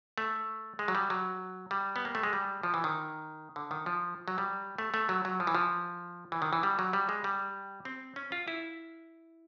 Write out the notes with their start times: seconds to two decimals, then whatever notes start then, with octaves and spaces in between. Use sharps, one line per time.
0.18 A3
0.79 G#3
0.88 F#3
0.95 G3
1.10 F#3
1.71 G3
1.96 B3
2.05 A#3
2.15 A3
2.23 G#3
2.33 G3
2.63 F3
2.74 E3
2.84 D#3
3.56 D3
3.71 D#3
3.86 F3
4.28 F#3
4.38 G3
4.78 A3
4.94 A3
5.09 F#3
5.25 F#3
5.40 F3
5.47 E3
5.55 F3
6.32 E3
6.42 D#3
6.53 E3
6.63 G3
6.79 F#3
6.93 G3
7.09 G#3
7.24 G3
7.85 C4
8.16 C#4
8.32 F4
8.48 E4